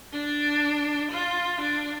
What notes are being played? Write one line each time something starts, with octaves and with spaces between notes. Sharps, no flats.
D4
F4
D4